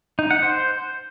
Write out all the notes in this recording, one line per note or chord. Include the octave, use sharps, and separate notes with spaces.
D#4
F#5
C5